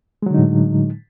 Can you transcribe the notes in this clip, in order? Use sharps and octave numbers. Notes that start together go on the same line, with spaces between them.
A2 D3 F#3 G#3 D#4